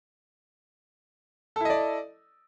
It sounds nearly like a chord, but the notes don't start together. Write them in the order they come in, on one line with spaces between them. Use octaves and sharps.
A4 E4 D#5 D5